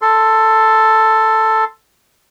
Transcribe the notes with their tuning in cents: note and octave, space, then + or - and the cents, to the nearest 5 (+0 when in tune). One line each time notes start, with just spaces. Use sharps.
A4 +5 C6 +0